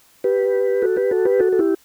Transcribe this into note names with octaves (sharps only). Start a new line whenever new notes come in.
G4 B4
F#4 A4
G4 B4
F#4 A4
G4 B4
F#4 A4
A4
E4 G4